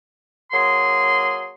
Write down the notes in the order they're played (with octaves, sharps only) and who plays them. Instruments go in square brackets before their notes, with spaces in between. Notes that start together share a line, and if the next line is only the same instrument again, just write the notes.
[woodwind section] F#3 A#3 G#4 C6